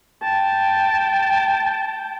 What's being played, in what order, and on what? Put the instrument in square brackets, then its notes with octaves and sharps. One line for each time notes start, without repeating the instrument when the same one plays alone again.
[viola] G5 A5